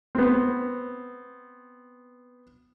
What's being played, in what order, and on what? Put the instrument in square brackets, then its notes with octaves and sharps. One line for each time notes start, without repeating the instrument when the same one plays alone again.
[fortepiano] B3 C4